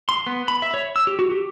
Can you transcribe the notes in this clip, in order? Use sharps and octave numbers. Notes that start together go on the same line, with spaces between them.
C6
B3
B5
E5
C#5
E6
G4
F#4
G4